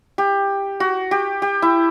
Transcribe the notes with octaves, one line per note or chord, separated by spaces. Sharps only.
G4
F#4
G4
G4
E4